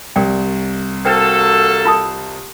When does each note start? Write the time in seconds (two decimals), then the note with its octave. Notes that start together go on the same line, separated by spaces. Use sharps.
0.16 C2 A#4 D5 G5
1.05 A#3 F#4 A4 C5 G5
1.85 F4 A5 D#6